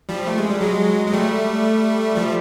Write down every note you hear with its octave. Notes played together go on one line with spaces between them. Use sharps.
F3 G3
A3
G#3
G3
F#3 G#3
G#3
G3 A3
F3 G3